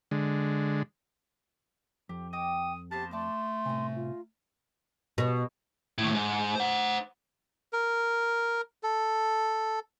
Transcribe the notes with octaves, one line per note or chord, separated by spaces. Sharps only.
D3 G#3
F2 G4
D#5 G5 D6 D#6
A#3 B3 G4 C5 A5
A3 D5 A5 C6 D6
A2 C3 G#5 A#5
F4
B2
D#2 A2
G#2
C5 F#5
A#4
A4